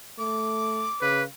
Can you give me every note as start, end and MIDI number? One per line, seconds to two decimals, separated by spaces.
0.18 0.88 57
0.18 1.23 86
1.01 1.24 49
1.01 1.23 71